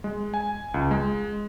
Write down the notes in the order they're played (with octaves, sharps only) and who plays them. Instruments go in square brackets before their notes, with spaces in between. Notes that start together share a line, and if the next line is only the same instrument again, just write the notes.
[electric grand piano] G#3
G#5
C#2
G#3